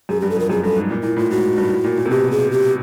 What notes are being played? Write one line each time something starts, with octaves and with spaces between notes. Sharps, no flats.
F#2 G#4
G2 G4
A4
F2 A#4
F#2 G#4
G2 A4
G#2
A#2
A#2 E4
A2 F4
G#2 F#4
G2
A2
A#2
A#2
C3
B2 G4
G#4
G4